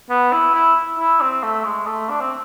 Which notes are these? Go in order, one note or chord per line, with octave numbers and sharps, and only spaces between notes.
B3
E4
E4
E4
C4
A3
G#3
A3
D4
C4